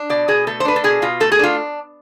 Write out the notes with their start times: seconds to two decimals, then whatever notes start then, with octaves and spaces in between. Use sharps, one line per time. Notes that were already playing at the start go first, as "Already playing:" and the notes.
Already playing: D4
0.10 B2 D5
0.28 B2 G#4
0.47 A3 A4
0.60 C5
0.65 D4 B4
0.76 A4
0.84 B2 G#4
1.02 B2 F4
1.20 A3 A4
1.32 G#4
1.39 D4 F4